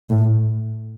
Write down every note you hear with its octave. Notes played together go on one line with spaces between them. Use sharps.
A2